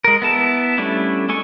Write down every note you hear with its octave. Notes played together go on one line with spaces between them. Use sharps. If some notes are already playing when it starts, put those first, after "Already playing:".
G#3 A#4
B3 E4 A5
G3 A3 C#4 D4 E4
G#3 A4 G#5 C#6